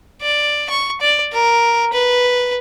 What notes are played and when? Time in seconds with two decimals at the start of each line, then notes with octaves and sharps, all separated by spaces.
0.22 D5
0.70 C#6
1.01 D5
1.33 A#4
1.93 B4